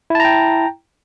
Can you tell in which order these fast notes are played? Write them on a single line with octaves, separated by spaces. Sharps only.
E4 A5 A#5 G5